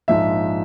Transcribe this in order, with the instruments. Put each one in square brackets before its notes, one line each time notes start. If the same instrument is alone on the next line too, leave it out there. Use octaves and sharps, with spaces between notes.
[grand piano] A#1 G#2 F3 E5